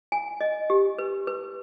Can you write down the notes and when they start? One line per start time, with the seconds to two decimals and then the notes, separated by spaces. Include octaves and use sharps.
0.12 G#5
0.41 D#5
0.70 G4
0.99 B4
1.27 B4